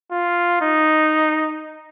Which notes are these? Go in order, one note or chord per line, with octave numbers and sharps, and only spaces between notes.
F4
D#4